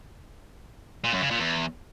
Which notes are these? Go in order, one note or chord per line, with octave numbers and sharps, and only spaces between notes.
A#2
F#2
C#3
A#2
E2